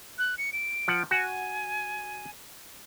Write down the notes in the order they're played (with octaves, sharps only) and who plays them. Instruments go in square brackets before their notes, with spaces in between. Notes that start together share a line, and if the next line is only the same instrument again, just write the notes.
[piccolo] F#6
C#7
D7
[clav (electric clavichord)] F3 F#5
[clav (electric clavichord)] F#4 [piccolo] G#5